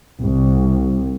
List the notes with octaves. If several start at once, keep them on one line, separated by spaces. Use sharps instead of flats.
C2